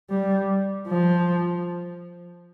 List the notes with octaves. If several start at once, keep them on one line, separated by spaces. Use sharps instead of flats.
G3
F3